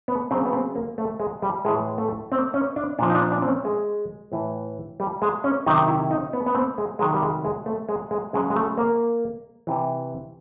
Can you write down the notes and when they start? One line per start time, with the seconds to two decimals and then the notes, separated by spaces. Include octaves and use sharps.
0.08 B3
0.31 C#3 F#3 C4
0.46 B3
0.53 C4
0.76 A#3
0.98 A3
1.20 G#3
1.42 G3
1.65 A2 E3 G#3
1.98 A3
2.32 C4
2.54 C#4
2.76 D4
2.99 A#2 F3 D4
3.10 D#4
3.15 D4
3.32 D4
3.42 C4
3.48 C#4
3.65 G#3
4.32 A2 E3
5.00 G3
5.22 G#3
5.44 C#4
5.66 C3 D#3 F#3 D#4
5.88 E4
6.11 D#4
6.33 B3
6.46 B3
6.55 C4
6.78 G#3
6.99 C3 D#3 F#3 G#3
7.14 G3
7.23 G#3
7.45 G#3
7.66 A3
7.89 G#3
8.11 G#3
8.33 C#3 F#3 G#3
8.50 G#3
8.56 A3
8.78 A#3
9.67 C3 E3